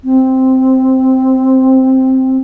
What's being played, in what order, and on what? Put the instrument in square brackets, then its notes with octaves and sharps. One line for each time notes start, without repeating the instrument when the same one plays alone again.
[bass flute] C4